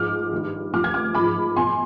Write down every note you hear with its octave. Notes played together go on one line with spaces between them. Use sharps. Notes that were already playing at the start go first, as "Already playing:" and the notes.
Already playing: G#2 F3 D6 F6
G2 D#3
G2 F3 D6 F6
F6 G#6
D6 F6
G#2 F3 B5 D6
B2 G#5 C6